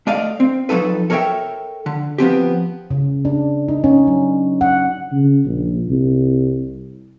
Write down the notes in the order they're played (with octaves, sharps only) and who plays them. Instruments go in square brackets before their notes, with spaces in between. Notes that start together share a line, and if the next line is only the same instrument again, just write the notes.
[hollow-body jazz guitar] A3 D5 D#5 F5
C4
F3 F#3 D#4 A4 B4
A4 A#4 C#5 D5 E5 G5
D3
F3 B3 C4 G4
[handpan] C#3
D4
D#4
C#4
F#3
F#5
[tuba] C#3
A#1
C2